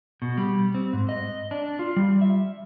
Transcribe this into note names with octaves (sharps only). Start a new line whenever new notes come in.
B2
G3
C4
G#2
D#5
D4
F4
G3
E5